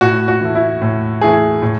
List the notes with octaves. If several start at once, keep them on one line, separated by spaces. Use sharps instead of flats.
A2 F#4
F#4
E3 A3
E4
A2
E3 A3 G#4
A2